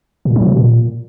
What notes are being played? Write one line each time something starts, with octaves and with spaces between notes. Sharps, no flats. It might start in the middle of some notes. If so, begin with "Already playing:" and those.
A#2
F#3
B2
A#2